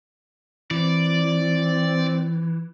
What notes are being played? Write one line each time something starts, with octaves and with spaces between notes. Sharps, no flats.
E3 C4 D5